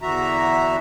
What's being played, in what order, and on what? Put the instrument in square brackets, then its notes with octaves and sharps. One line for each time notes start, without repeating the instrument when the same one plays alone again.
[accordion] E2 D3 E3 F#4 E5 A#5